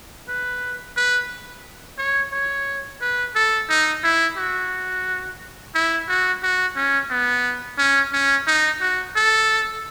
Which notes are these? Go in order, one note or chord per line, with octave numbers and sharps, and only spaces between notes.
B4
B4
C#5
C#5
B4
A4
D#4
E4
F#4
E4
F#4
F#4
C#4
B3
C#4
C#4
D#4
F#4
A4